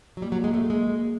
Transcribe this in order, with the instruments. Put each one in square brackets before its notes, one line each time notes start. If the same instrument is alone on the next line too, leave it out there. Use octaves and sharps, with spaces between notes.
[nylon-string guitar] F#3
[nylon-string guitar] G3 [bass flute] A#3
[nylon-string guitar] F#3
G#3
A3
G#3